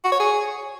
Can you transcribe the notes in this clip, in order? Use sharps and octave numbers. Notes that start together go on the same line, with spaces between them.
F#4
C#5
G#4